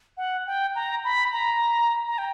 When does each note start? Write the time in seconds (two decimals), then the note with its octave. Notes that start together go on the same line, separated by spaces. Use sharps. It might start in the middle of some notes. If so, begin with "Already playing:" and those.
0.17 F#5
0.47 G5
0.75 A#5
1.04 B5
1.33 A#5
2.07 A#5
2.18 G5